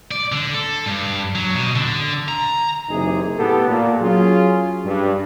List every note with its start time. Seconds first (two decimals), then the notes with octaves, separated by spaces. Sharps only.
0.11 D5
0.32 D3
0.54 A4
0.86 G2
1.35 F#3
1.54 B2
1.76 D3
2.28 A#5
2.90 F#1 C3 E3 D#4 G#4
3.37 A2 B3 G4 A4
3.68 A#2
4.01 F#3 C#4 F4 G#4
4.84 G2